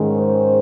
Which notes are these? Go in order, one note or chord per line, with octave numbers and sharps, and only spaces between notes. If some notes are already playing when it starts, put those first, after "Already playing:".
Already playing: G#2 D#3 G#3 C#4
C5